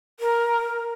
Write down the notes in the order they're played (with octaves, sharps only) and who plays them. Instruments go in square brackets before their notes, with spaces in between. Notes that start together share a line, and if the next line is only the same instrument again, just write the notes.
[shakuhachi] A#4